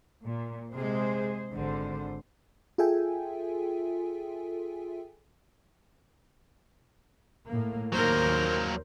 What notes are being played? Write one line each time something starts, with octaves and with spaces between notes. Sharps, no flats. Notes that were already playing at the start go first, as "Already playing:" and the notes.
A#2
C3 G#3 G#4 C5
G#1 D3 C5
F4 G#4 A4 E5 G5 G#5
A2 A#3
D#2 F#3 A#3 A#4 C5